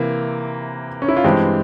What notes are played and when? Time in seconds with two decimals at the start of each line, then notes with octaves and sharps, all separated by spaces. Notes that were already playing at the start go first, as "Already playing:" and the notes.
Already playing: C3 E3 A#3
1.02 C#4
1.08 E4
1.17 F4
1.24 G2 E3 G#3 C4 G4